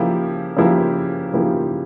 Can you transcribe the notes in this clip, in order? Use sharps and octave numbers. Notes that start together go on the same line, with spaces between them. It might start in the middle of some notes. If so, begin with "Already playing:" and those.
Already playing: C#3 F3 A#3 E4 G4
C#3 F3 A#3 E4 G4
C#3 F3 A#3 E4 G4